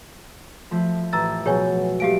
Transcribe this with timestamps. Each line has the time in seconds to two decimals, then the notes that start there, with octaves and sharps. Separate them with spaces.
0.71 F3 A3
1.13 A1 A#5 E6 A6
1.46 B2 F#3 G#4 C#5 G#5
2.00 G#3 A3 D4 G4 F5 D7